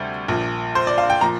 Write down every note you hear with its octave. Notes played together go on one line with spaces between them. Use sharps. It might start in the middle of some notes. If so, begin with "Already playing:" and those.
Already playing: D2 C3 G3
A#1 A#2 F3
C5
D5
F5
G5
A#2 F3 A#5